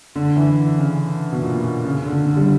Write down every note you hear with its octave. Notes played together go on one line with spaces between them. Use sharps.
D3
E3
C#3
B2
A#2
C#3
D3
D3
G3